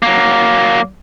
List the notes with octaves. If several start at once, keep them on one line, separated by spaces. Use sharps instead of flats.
F#3 A#3